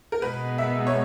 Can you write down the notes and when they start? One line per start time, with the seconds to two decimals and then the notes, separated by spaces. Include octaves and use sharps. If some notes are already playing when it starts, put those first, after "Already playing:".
0.12 A#4
0.22 B2 G#3 B3 D#4 B4
0.58 E5
0.87 C#5